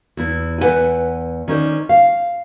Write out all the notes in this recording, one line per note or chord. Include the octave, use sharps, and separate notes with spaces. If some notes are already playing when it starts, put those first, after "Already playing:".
E2 E4
E2 G#3 B4 F#5 G#5
D#3 C#4 C5 D5
F5